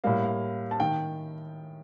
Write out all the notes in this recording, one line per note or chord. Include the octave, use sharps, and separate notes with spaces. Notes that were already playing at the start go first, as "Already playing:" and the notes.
A2 G3 A#3 F5
F5
A5
D#3 G5